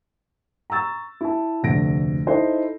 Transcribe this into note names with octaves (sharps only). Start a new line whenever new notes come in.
A#5 C#6 E6 A6
E4 A5
F1 D2 A#6 D7
D#4 E4 A4 C5 D#5